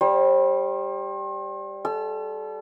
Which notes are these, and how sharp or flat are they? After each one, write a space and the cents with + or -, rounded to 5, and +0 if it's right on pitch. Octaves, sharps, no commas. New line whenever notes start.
G3 +0 C5 +40
A4 -25 E6 +45